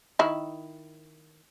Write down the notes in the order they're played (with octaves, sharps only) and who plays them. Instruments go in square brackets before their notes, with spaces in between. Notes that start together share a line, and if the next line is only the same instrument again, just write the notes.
[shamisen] D#3 E4